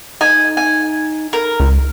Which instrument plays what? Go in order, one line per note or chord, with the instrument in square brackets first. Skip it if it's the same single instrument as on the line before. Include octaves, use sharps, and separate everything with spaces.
[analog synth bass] D#4 [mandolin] G#5
[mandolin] G#5
A#4
[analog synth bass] C#2